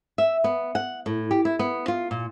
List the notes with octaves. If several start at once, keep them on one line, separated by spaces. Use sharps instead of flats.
E5
B3
F#5
A2
G4
E4
B3
F4
A#2